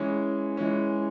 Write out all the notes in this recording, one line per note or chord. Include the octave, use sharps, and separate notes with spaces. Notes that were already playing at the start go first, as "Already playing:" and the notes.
Already playing: E3 G#3 C#4
E3 G#3 C#4